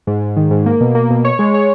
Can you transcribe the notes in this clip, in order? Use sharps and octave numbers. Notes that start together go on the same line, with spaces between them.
G#2
G#2
D#3
G#2
A#3
B2
A#3
B2
C#5
G#3
C#5